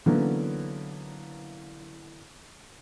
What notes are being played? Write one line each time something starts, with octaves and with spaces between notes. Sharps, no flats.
D3 E3 F#3 A#3 B3 C#4